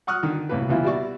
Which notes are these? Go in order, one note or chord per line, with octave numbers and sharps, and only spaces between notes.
F#5 C#6 D#6 F6 F#6
D3 D#3
C2 A2 A#3 B4
C#2 B2 E3 A#3 E4 F4
B2 G3 E4 F#4 D5 C#6